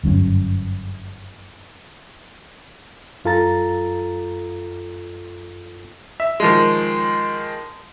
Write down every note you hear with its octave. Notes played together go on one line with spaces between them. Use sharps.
G1 F#2 A2 C#4
F#2 F4 A4 A#5 A6
E5
D#3 F3 G#3